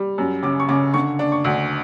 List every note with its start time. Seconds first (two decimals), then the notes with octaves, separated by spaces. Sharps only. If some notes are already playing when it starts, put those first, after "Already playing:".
Already playing: G3
0.18 F#2
0.43 C#3 D6
0.60 C#6
0.69 C#3 D6
0.94 D3 C#6
1.19 D4
1.32 C#6
1.44 D2